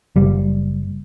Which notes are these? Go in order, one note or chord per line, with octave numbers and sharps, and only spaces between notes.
F#1 G3